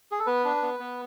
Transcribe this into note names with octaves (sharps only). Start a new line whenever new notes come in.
G#4
A4
B3 B4
D4
B3
B3